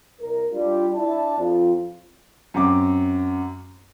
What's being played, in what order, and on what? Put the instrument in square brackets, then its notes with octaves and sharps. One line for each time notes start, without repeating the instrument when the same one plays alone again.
[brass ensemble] C2 A#4
G3 D4 F4
D4 E4 A5
F2 C4 F4
[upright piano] F#2 C4 F#4 D6